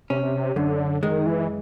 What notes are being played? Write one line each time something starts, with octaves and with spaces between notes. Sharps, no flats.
C3 C#4
F#2 D3
D#3 G#3
E3